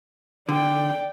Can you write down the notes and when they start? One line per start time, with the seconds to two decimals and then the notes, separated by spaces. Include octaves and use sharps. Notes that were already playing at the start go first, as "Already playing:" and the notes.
0.49 D3 D5 G5